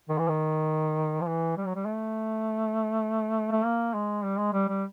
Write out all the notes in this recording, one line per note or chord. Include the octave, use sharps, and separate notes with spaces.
D#3
E3
D#3
F3
E3
G3
F#3
G3
A3
A3
A#3
G#3
G3
G#3
G3
G3